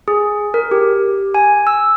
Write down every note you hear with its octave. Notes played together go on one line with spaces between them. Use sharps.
G#4
A#4
G4
G#5
E6